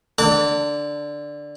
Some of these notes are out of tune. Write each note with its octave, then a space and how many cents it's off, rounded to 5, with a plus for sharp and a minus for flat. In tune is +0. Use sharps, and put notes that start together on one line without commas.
D3 +0 A5 +35 D6 -25